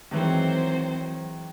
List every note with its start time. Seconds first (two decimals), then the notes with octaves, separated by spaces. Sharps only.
0.11 D#3 E3 F#3 G#3 C4 C5